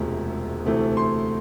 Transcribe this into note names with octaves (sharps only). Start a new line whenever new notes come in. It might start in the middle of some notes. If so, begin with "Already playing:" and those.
Already playing: E1 D2 C3 F3 G#3
D2 C3 E3 A3
C6